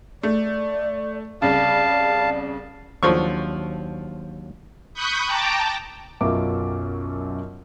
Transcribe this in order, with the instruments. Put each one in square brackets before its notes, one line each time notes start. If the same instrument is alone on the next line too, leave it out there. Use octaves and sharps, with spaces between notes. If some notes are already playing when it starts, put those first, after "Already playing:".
[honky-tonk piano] A3 [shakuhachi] D5
[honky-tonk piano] C2 C#3 [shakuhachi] D5 [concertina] F5 A5
[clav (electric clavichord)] D#2 F#3 D4 [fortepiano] F3 C#6
[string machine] B5 C#6 D#6 F#6 G6
G5 A5 A#5 D6
[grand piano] B1 F#2 F4 A#4 E5 D6